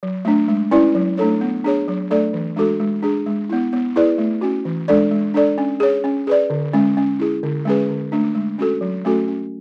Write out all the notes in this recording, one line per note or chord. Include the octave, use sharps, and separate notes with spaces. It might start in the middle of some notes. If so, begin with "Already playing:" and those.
F#3
A3 D4
G#3
C#4 E4 B4 D5
F#3
A3 D4 A4 C#5
B3
D4 G#4 C#5
F#3
A3 D4 A4 D5
E3
G#3 D4 F#4 A4
G#3
D4 G#4
G#3
B3 E4
B3
E4 G#4 B4 D5
A3
C#4 F#4
E3
G#3 D4 A4 D5
G#3
D4 A4 D5
C#4
G#4 C#5
C#4
G#4 B4 D5
D3
G#3 C#4
C#4
E4 G#4
D3
G#3 C#4 G#4 B4
D3
A3 D4
G#3
C#4 F#4 A4
F#3
A3 C#4 F#4 A4
C#4